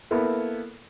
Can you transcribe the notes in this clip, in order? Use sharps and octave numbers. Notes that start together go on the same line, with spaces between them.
A#3 B3 E4 A4